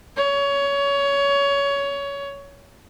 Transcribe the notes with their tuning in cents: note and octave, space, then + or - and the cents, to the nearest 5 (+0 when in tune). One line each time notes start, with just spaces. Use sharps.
C#5 +20